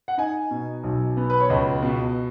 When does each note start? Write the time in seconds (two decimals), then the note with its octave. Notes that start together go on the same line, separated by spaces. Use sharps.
0.08 F#5
0.18 D#4 G#5
0.51 B2
0.84 B1
1.17 B3
1.30 B4
1.40 C#5
1.50 C#2 D#5
1.83 B2